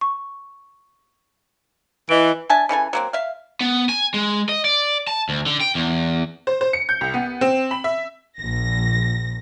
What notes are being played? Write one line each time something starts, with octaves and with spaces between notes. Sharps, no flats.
C#6
E3 D#5 D7
D4 E5 G#5 A5
C#3 E3 A4 G#5
F#3 A#3 C4
E5 F5
B3
G#5
G#3
D#5
D5
A5
D2
D3
G5
E2
C5
C5
C#7
G6
C2
B3
C4
B5
E5
A#1 A#6